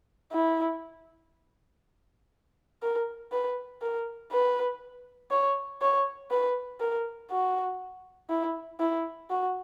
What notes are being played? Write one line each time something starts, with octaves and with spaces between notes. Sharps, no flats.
E4
A#4
B4
A#4
B4
C#5
C#5
B4
A#4
F#4
E4
E4
F#4